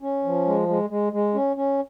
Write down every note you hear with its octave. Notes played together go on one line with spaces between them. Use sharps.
C#4
F3
G#3
G#3
G#3
G#3
C#4
C#4